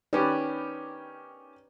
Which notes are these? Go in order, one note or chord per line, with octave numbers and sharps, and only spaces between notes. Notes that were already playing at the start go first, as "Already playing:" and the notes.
D#3 C#4 G4 B4 D5